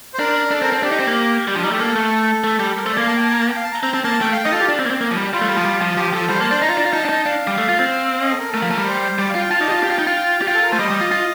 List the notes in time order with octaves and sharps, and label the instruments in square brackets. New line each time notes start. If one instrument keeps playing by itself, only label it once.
[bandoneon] C5
[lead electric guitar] D4 [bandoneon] A#4
[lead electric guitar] D4 [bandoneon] A4
[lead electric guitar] C4 [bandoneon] A#4
[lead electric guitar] C4 [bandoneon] A4
[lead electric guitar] D4 [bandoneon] G4
[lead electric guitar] D#4
C4
A#3
[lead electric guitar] G3 [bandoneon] G4
[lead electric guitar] F3 [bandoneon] D4
[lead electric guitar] G3 [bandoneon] D#4
[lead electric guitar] A3 [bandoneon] G4
[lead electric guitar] A#3 [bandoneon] A4
[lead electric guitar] A3
A3
G3
[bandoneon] A#4
[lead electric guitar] A3 [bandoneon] C5
[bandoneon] D5
[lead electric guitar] A#3 [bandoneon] F5
[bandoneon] A5
G5
A5
A#5
A5
G5
F5
A5
A#5
[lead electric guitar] C4 [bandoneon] A#5
[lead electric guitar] C4 [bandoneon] A5
[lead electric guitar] A#3 [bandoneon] A5
[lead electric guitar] A3 [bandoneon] G5
[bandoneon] F5
G5
[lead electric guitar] D#4 [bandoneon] D#5
[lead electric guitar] F4 [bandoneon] A4
[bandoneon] G4
[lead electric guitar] D4
C4
A#3
C4
A#3
F3
G3
[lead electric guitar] G3 [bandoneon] F4
[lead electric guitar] A3
G3
F3
G3
F3
[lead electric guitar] F3 [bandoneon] G4
[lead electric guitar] F3 [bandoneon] A4
[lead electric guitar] G3 [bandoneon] C5
[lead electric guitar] A#3 [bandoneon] A5
[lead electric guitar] D4 [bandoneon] C5
[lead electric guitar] D#4 [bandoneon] A#5
[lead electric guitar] F4
D4
F4
[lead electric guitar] D#4 [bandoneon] A5
[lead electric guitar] D4
D#4
[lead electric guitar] D4 [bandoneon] F5
[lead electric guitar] G3
A3
F4
C4
[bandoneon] D#5
A4
A#4
A4
[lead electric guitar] A3 [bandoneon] A#4
[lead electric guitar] F3
A3
G3
[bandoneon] C5
[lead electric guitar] G3 [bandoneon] D5
[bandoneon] F5
[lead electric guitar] F4 [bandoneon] G5
[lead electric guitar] F4 [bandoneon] A5
[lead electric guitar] D#4 [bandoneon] D5
[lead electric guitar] G4 [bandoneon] D#5
[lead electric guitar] F4
[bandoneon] F5
[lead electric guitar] G4 [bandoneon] G5
[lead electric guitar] F4
D#4
F4
G4
[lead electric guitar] F4 [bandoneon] G5
[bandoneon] A4
A#4
[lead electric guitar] A3 [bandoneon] C5
[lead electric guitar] G3 [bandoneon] D#5
[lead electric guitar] G3
F4
F4